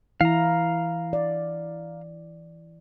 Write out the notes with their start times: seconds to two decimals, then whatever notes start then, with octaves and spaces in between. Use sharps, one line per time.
0.21 E3 E4 F5 A#5
1.13 D5